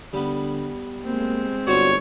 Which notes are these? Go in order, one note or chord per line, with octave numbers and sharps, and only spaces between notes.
D3 G3 B3 B4
G#3 A#3 C4
G1 D4 F#4 C5 C#5